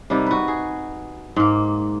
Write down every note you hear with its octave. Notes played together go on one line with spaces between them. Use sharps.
C3 G3 A#3 D#4
F#4 B4
G#4
G#2 A#3